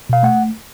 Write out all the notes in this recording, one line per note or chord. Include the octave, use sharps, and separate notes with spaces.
B2 F5
A3 F#5